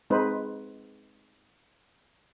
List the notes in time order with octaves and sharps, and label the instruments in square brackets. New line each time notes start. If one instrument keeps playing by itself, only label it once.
[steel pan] G#3 C4 D#4 B4 C5